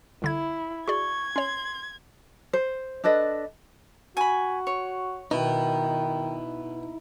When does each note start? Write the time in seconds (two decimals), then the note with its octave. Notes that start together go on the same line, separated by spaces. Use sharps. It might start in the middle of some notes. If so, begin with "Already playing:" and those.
0.22 C2 D3 E4 G#6
0.88 F#4 G#4 D5 C#6 G#6
1.36 C#4 C#5 C6
2.53 C5
3.04 D4 A4 B4 D#5
4.17 F#4 G#5 B5
4.67 C#5
5.31 B2 D#3 D#4 E4